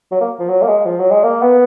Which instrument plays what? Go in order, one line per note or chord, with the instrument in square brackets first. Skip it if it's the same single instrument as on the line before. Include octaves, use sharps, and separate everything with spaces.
[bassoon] F#3
A#3
F3
F#3
A#3
G#3
F3
F#3
G#3
A#3
B3